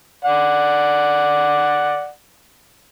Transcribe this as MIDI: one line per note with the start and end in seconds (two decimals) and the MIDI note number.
0.25 2.09 74
0.25 2.09 78